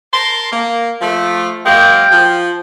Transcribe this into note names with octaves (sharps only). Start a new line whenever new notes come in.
A#4 A5 C6
A#3
F3 A3
F#3 G#3 A#3 G5
F3